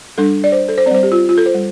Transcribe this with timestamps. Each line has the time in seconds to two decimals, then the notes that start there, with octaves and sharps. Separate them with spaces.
0.18 G3 D4 A4
0.44 D5
0.52 C5
0.69 A4
0.78 C5
0.86 C4 D5
0.91 G3 C5
1.03 G4
1.12 F4
1.29 F4
1.38 A4
1.46 C5
1.55 G3